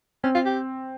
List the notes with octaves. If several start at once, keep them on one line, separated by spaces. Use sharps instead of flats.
C4 C#4
F4
G4